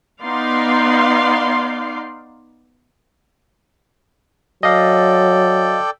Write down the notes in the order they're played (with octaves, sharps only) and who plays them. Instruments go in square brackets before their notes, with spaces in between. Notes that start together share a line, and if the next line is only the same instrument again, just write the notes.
[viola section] B3 D#4 D5 F5 C6
[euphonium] F#3 [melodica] A4 D5 G5 [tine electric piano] D#5 F5